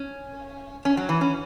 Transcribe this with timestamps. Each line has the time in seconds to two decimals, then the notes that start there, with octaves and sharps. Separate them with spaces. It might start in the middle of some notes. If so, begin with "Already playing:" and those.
Already playing: C#4
0.85 C#4
0.97 F#3
1.09 E3
1.21 C#4